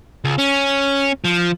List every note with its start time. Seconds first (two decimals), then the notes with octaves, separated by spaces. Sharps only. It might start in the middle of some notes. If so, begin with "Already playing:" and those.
0.25 C#2
0.39 C#4
1.25 F3